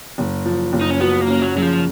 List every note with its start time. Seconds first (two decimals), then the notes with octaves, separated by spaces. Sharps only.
0.18 F#1
0.45 F3
0.73 F#1
0.81 D#4
0.90 C#4
1.00 B3 F#4
1.21 A#3
1.28 C#4
1.41 F#3
1.55 C#3 F#3
1.62 F3